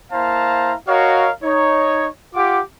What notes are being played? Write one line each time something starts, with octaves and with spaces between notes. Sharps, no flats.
A#3 E4 C5 F5 A5 A#5
F#4 A#4 C#5 D#5 F5
D#4 C#5
F4 G4 F#5 D6